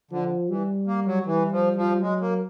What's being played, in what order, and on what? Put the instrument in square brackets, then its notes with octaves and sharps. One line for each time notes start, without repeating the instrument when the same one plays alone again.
[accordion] D3 [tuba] F3
[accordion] E3 [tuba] G3
[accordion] A#3
F#3
[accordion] E3 [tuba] G3
[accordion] F3
F3
[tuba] F#3 [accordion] G#3
[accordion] A#3